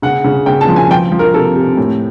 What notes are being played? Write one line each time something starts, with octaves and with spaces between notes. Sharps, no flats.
C#3 F#5
C#3
C#3 G5
A5
F3
G#5
F3 G5
F3
A#4
C3 A4
C3
A2